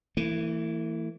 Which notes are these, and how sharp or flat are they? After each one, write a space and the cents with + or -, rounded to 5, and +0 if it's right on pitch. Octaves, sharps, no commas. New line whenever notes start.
E3 +0 A3 +45